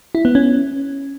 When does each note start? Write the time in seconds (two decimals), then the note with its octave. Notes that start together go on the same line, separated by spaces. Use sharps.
0.15 E4
0.25 B3
0.35 C#4